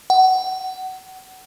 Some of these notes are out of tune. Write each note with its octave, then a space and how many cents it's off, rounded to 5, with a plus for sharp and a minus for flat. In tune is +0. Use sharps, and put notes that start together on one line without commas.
F#5 +25